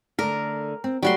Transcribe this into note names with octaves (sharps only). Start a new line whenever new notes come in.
D3 A3 A#4
C4
F#3 G3 A3 F#4 C6